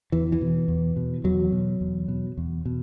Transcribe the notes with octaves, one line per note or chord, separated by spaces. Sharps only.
E2 E3
E3
B2
E2
B2
E2 F#3
B2
E2
B2
E2
B2